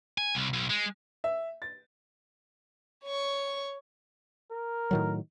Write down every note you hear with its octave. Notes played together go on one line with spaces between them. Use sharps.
G#5
C2
B1
G#3
E5
A6
C#5 C#6
A#4
A2 D#3 F#3